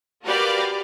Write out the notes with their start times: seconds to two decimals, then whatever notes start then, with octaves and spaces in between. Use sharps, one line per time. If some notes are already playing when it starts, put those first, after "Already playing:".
0.25 F#4 G4 A#4 B4 D5 F5